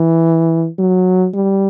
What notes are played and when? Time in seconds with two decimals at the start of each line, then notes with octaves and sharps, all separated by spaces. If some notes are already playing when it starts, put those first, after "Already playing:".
Already playing: E3
0.79 F#3
1.34 G3